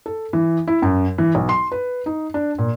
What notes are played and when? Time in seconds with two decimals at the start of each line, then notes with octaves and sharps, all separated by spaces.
0.06 A4
0.33 E3
0.67 E4
0.82 F#2
1.18 E3
1.35 B1
1.49 C6
1.72 B4
2.06 D#4
2.34 D4
2.59 A#2